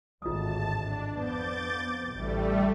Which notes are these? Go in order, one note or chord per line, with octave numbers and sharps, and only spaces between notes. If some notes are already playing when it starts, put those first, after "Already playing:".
G#1 D2 A2 F4 A5 D#6
D4
F2 F3 B3 D6 G6 A6
A1 D2 G3 A3